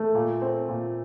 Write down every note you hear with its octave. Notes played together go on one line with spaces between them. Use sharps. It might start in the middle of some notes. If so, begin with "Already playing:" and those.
Already playing: A3
A#2
C4
A#2